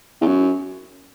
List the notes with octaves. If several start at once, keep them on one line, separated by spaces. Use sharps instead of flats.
E2
F#2